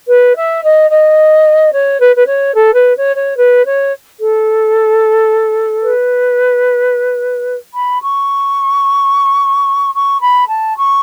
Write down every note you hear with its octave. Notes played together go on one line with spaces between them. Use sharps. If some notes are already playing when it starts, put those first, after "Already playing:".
B4
E5
D#5
D#5
C#5
B4
B4
C#5
A4
B4
C#5
C#5
B4
C#5
A4
B4
B5
C#6
C#6
B5
A5
C#6